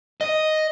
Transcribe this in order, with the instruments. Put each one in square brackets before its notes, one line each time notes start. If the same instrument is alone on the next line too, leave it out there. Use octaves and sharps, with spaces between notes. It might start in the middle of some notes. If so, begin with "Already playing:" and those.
[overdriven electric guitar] D#5